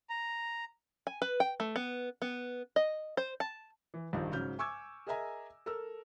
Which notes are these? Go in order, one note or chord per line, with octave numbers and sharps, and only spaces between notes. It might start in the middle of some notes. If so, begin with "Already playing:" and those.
A#5
G#5
B4
G5
A3
B3
B3
D#5
C5
A5
E3
A#1 G2 D#3 F3
G#2 C#3 F#3 F6 G6
G#5 C#6 D6 E6 G#6
G#4 A#4 D#5 E5 G#5 A#5
A4 A#4 E6